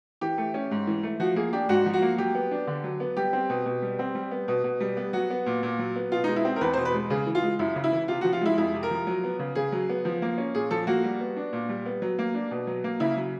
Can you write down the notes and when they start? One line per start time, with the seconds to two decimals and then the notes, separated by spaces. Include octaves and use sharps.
0.21 E3 G4
0.38 A3
0.54 C#4
0.71 G#2
0.87 E3
1.03 A3
1.20 F3 F#4
1.36 A#3 G#4
1.53 D4 G4
1.69 G#2 F#4
1.86 F3
1.94 F#4
2.02 A#3
2.18 F#3 G4
2.35 B3
2.51 D4
2.67 D3
2.84 F#3
3.00 B3
3.17 G3 G4
3.33 C4
3.50 B2
3.66 B2
3.82 G3
3.99 C4
4.15 G3
4.31 B3
4.48 B2
4.64 B2
4.80 G3
4.97 B3
5.13 F#3 F#4
5.30 B3
5.46 A#2
5.63 A#2
5.79 F#3
5.96 B3
6.12 B2 F4
6.24 D#4
6.28 G#3
6.36 E4
6.45 C4
6.56 A#4
6.61 E2 B4
6.73 C5
6.77 B2
6.85 B4
6.94 G#3
7.10 C#3 G#4
7.27 E3
7.35 F4
7.42 G#3
7.59 F#2 E4
7.76 C#3
7.84 E4
7.92 E3
8.08 C3 F4
8.21 F3 F#4
8.33 F4
8.41 G#3 E4
8.58 F2 E4
8.74 C3
8.83 A#4
8.91 F3
9.07 F#3
9.24 B3
9.39 C#3
9.55 C#3 G#4
9.72 F#3
9.89 B3
10.05 F3
10.22 A#3
10.38 C#4
10.55 A#2 G#4
10.71 F3 A4
10.87 A#3 F#4
11.04 G3
11.20 B3
11.36 D4
11.53 A#2
11.69 G3
11.86 B3
12.02 F#3
12.19 A#3
12.34 D4
12.51 B2
12.67 F#3
12.84 A#3
13.00 C#3 E4
13.17 F#3